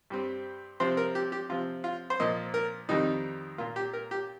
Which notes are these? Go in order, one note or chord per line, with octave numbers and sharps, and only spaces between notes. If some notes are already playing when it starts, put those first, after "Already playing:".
G2 G3 C4
C3 F3 C4 C5
A#4
G4
G4
C3 F3 C4 F4
F4
C5
A#2 F3 A#3 D#5
A#4
F2 D#3 G3 D#4
A#2 A#3 F4
G4
A#4
G4